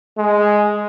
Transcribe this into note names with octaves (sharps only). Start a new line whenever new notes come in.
G#3